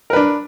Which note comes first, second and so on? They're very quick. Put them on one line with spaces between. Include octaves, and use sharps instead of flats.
A#4 B4 D4